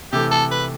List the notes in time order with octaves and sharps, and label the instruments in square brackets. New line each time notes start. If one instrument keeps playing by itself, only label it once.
[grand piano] C3 E3 A3 [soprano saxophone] G4
[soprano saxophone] A4
B4